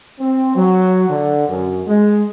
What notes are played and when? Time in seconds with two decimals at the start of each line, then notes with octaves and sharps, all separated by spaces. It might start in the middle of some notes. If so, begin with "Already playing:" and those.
0.20 C4
0.55 F#3
1.09 D3
1.48 F#2
1.87 G#3